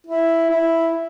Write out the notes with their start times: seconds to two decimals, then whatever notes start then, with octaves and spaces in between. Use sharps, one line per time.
0.07 E4
0.50 E4